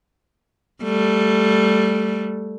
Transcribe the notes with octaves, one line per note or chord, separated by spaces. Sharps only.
G3 A3